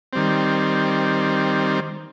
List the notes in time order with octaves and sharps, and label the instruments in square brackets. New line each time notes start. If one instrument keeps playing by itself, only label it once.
[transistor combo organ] D#3 G3 C4